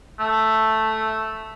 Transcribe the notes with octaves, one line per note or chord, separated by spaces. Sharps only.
A3